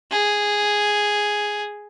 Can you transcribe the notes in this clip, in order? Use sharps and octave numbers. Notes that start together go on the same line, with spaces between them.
G#4